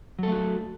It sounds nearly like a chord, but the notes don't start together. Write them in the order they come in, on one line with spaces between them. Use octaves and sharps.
F#3 A4 A3 F#4